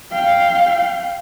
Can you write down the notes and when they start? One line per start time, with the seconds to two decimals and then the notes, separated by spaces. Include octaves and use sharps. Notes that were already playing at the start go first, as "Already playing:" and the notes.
0.11 F5 G5